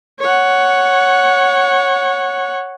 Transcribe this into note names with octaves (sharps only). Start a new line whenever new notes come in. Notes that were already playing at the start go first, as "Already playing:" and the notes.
C#5 F#5